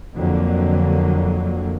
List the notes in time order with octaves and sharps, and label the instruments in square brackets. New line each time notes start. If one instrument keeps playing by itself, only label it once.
[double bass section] F2 D3 F#3 A#3